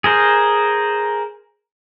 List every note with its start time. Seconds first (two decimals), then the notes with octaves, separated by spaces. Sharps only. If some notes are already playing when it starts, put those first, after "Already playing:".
0.04 G#4 A#4 C5